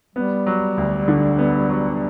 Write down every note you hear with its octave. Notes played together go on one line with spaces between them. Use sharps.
G3 B3
F#3
D2
D3
B3
F#3